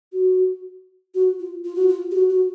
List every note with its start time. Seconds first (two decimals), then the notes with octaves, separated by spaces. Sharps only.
0.12 F#4
1.15 F#4
1.39 F4
1.65 F4
1.76 F#4
1.88 F4
2.11 G4
2.15 F#4
2.29 F#4